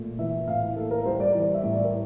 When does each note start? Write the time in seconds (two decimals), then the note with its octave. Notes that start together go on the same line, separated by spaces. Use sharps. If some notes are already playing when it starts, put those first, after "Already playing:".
Already playing: A#2 A3
0.19 E3 E5
0.48 A2 F5
0.76 A#3 A4
0.91 A#4
1.05 G3 C5
1.20 D5
1.34 E3 D5
1.54 E5
1.63 A2
1.73 D5
1.84 A#4